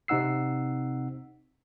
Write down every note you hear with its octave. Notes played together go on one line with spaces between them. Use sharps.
C3 C4 D#4 F#5 E6 C7